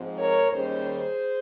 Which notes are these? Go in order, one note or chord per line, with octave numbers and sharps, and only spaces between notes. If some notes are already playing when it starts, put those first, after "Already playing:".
Already playing: G#2 F3 C4
A#4 C#5
D#2 D#3 G3 C#4 G#4 C5